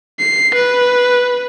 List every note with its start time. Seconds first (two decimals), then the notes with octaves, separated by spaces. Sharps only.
0.19 C7
0.55 B4